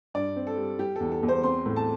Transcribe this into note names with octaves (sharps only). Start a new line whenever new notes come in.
G2 D5
C4
A4
G3
G3 G4
E2 A4
A4
E2
C5
C4 C6
A2
A5